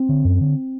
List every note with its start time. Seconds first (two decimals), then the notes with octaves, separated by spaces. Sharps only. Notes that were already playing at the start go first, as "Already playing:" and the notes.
Already playing: C4
0.09 D3
0.25 F#2
0.41 D3